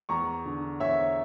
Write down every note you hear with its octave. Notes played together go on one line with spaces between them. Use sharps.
E2 A#5 C#6
D3
E2 C#5 E5